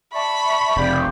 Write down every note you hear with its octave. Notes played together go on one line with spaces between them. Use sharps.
D5 E5 A5 B5 C#6
F1 C#3 C4 G4 D5